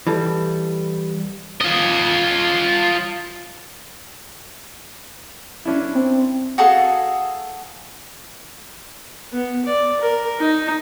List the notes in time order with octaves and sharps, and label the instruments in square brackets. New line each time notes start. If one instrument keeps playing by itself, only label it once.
[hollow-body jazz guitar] E3 G3 A4
[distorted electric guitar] F4 D#5
[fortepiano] C#4 D4 E4
[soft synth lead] C4
[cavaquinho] F#4 G#4 A4 F5
[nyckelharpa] B3
D5
A#4
D#4